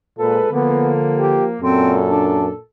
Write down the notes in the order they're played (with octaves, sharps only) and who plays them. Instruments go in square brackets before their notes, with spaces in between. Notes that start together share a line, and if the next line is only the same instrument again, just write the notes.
[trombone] A#2 [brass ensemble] G#3 F4 B4 [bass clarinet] A4
[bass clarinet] D3 [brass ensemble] F3 A#3 [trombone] B3
[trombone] G4
[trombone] F#2 [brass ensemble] A#2 A4 [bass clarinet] C4
[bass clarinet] D4